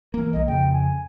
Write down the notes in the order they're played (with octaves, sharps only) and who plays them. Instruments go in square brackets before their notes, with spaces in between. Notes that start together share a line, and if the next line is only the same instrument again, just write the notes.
[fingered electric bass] E3 A#3 [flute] A#4
[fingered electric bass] B1 G3 A#3 [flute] D#5
[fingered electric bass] F2 C#3 [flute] G5
[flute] G#5